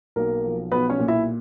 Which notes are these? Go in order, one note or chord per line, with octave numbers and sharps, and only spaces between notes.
B1 A#3 A#4
F3
B1 B3 B4
C#4 C#5
A#2
E4 E5